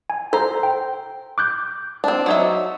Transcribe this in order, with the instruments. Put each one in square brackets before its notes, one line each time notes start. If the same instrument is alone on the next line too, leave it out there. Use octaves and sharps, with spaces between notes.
[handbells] G#5
[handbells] A4 A#5 [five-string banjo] C5
[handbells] G5
D6 F#6 G6
[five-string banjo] C4 D4
F#3 D#4 E5